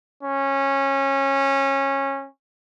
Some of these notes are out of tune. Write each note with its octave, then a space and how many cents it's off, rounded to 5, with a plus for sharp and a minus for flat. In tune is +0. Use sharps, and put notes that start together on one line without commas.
C#4 -20